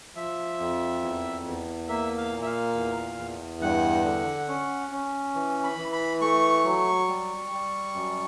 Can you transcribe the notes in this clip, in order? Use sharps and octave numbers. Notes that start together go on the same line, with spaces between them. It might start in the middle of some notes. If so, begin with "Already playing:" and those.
F3 E5
F2
E2
E2
A#3 E5
F5
A#2
E5
F5
E2
E2
G2 F#5
D3
C#4
C#4
E3
B5
E3
B5
A3 C#6
F#3
G3
G3
F#2